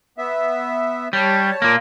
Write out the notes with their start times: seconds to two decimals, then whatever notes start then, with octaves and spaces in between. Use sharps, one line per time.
0.18 B3 E5
1.13 G3 C#5 A5
1.62 A#2 A#3